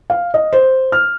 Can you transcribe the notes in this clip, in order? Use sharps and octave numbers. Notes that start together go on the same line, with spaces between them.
F5
D#5
C5
F6